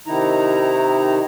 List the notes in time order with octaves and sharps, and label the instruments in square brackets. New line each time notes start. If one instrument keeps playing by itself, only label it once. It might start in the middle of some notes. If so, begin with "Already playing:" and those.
[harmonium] C3 D#3 D#4 E4 A#5